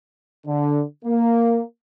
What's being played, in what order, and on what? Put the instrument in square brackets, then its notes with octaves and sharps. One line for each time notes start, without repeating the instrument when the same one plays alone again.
[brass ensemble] D3
A#3